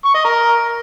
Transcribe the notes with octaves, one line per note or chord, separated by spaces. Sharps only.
C#6
D#5
A#4